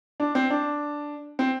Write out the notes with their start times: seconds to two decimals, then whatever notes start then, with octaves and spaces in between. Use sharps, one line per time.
0.20 D4
0.35 C4
0.50 D4
1.39 C4